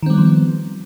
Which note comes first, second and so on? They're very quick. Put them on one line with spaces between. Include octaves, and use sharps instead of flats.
D#3 C4 G3 B3 F3